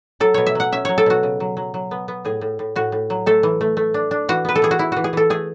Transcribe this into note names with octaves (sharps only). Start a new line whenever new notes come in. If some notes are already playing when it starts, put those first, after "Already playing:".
F#3 A4
B2 C#5
E5
F#3 F#5
C#4 E5
F#3 C#5
A4
B2 F#4
C#3
F#3
F#3
F#3
B3
B3
A2 G#4
A2
A2
A2 F#4
A2
F#3
A3 A4
E3
A3
A3
D4
D4
E3 F#4
B3 B4
A4
E3 G#4
F#4
E3 E4
E3 F#4
G#4
E3 A4
A3 G#4